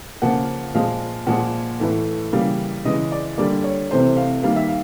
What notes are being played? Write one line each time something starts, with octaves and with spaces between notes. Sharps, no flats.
C#3 F3 A#3 F#5
A#2 F3 G#3 F5
A#2 F3 G#3 F#5
A2 E3 A3
C#3 E3 G3 A#3 F5
C#3 E3 G#3 D#5
D5
D3 G3 A#3 D5
C#5
C3 E3 A3 C5
F5
D#3 G3 A#3 F5
E5
F5